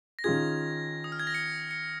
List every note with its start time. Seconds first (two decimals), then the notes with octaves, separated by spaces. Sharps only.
0.19 A#6
0.24 D#3 C#4 F4 G#4 G#6
1.04 D#6
1.12 F6
1.20 G#6
1.27 A#6
1.34 G#6 C#7
1.71 C#7